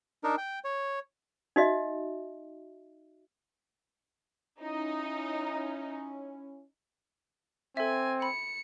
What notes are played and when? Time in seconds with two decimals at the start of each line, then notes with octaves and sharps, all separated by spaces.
0.24 D4 D#4 A#4
0.38 G5
0.64 C#5
1.56 D#4 F#4 D#5 E5
4.61 C#4 D#4 E4
7.77 C4 A4 E5 G#5
8.22 B5 C#7